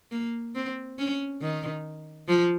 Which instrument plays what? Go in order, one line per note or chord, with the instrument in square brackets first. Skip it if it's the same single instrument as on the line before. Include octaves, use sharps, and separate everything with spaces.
[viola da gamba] A#3
C4
C#4
D#3
F3